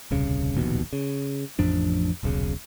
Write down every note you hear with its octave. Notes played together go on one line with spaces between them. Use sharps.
D#1 C2 C#3
D1 A#1 D#2 B2
C#3
A1 F2 F3 D4
D#1 B1 A2 C#3